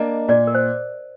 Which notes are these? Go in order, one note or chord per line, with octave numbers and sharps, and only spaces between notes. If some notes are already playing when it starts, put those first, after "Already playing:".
Already playing: A#3 D4 D#5
A#2 D5
A#4
C5